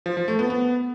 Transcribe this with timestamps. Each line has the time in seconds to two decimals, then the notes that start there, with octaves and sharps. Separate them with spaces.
0.06 F3
0.17 F3
0.28 A3
0.39 B3
0.50 B3